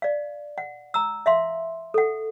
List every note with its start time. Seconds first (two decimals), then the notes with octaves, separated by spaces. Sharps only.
0.02 D5 F5
0.58 F#5
0.94 A#5 E6
1.26 E5 F5 C6
1.94 A4 F#5